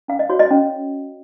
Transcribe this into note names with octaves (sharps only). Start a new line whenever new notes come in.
C#4 F5
D#5
F#4 C#5
D#5
C#4